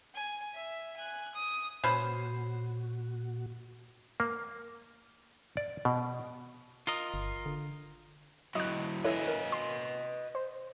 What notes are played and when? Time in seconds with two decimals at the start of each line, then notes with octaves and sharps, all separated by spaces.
0.14 G#5
0.55 E5
0.96 G#5 F#6
1.35 D#6
1.84 A#2 C#4 F#4 B4 C5
4.20 A#3
5.57 D5
5.85 B2
6.87 F4 A#4 D#5
7.14 G1
7.46 D3
8.55 F#3 E4 F#4 D#5 F#6
9.04 E4 A4 B4 C#5 D#5 G#5
9.28 A#4
9.52 C6
10.35 C5